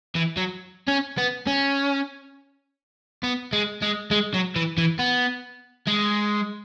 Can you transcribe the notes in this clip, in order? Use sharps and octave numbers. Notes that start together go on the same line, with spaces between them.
E3
F#3
C#4
B3
C#4
B3
G#3
G#3
G#3
F#3
E3
E3
B3
G#3